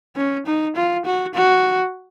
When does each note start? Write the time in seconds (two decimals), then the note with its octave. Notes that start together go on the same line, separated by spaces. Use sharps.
0.17 C#4
0.46 D#4
0.76 F4
1.05 F#4
1.34 F#4